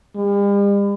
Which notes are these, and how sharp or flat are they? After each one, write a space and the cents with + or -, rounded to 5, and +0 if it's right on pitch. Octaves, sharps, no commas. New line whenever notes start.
G3 +45